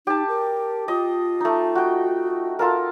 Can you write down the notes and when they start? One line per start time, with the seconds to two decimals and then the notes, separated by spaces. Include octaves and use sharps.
0.07 D#4 G4 A5
0.28 A#4
0.88 F4 D#5
1.40 A3 D#4
1.75 F#4 G5
2.59 F4 A4 A#4